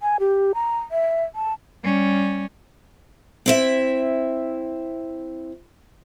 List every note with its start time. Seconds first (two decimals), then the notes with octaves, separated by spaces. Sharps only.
0.01 G#5
0.20 G4
0.55 A#5
0.91 E5
1.35 A5
1.84 G3 C#4
3.46 C4 E4 E5